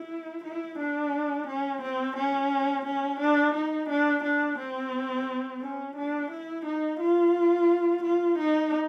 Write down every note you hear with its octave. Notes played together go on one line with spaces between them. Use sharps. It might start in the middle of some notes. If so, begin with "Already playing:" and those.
Already playing: E4
E4
D4
C#4
C4
C#4
C#4
D4
D#4
D4
D4
C4
C#4
D4
E4
D#4
F4
F4
D#4